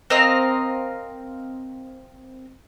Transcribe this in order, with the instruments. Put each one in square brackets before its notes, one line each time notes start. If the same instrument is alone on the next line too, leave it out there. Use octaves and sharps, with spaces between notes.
[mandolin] C4 A#4 D#5 F5